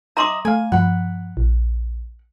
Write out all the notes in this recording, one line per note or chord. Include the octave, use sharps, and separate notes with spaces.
D#5 E5 A#5 C6 D6 D#6
A3 F5 G#5
G2 F3 F#5 B5
A#1